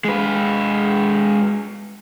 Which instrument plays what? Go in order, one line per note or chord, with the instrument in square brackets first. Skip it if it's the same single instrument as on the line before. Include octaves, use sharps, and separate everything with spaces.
[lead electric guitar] G#3 B4